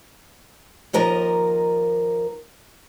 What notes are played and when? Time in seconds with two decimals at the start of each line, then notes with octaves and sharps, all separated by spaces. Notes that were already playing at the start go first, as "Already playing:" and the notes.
0.93 D#2 F3 A#4 D#5 A#5